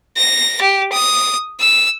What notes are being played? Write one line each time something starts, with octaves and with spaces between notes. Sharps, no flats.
A#6
G4
D#6
E6